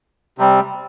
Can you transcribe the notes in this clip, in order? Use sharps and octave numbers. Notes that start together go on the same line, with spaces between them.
C3 G3 C4